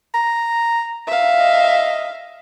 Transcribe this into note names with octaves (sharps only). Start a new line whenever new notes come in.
A#5
E5 F5
D#5